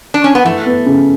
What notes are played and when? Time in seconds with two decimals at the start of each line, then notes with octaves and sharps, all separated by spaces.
0.14 D4
0.24 C#4
0.35 B3
0.45 E3 A3
0.66 B3
0.86 C#3